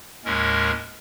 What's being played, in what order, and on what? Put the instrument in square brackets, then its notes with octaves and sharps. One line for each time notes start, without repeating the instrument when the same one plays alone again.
[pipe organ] D#2 A2 G#3 C#4 A#4